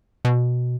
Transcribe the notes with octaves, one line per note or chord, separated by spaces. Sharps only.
B2